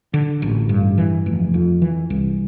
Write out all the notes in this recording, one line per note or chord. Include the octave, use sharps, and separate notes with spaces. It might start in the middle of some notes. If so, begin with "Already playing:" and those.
D3
A1
G2
E3
F1
F2
E3
C2